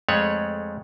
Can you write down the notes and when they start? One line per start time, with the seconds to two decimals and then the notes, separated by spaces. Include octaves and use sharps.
0.09 F2 G#3 A3 C#5 F#5